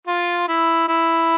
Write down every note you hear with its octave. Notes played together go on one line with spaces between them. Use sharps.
F4
E4
E4